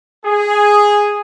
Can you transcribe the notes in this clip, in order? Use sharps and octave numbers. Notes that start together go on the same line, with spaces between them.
G#4